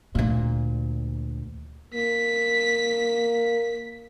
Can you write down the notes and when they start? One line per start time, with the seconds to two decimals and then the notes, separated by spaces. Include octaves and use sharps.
0.15 D2 A#2
1.94 A#3 B6